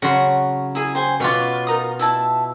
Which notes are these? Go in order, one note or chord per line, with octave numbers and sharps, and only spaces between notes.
C#3 F#3 F#5 C6 C#6
E4 G#4
C5 G5 G#5
B2 F4 B4 C#5 D6
D#4 A#4 D#6
E4 E5 A5